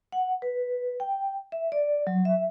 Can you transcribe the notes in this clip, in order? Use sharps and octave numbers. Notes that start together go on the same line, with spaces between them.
F#5
B4
G5
E5
D5
F#3
E5